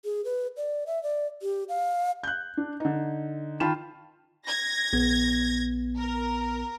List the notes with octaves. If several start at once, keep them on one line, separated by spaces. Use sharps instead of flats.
G#4
B4
D5
E5
D5
G4
F5
F#6 G6
D4
D3 D#4
D#3 F4 G5 A5 B5 E7
G#6 A#6
A#1 B3
A#4